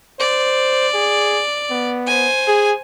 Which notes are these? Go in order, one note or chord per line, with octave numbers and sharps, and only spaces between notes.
C5 D5
G#4
B3
C5 G#5
G#4